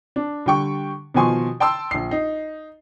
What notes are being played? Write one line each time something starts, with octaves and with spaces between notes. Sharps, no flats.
D4
D3 G3 G5 C#6
B2 D#3 F3 G#5 C6 C#6
G5 A5 C6 E6
A#1 C7
D#4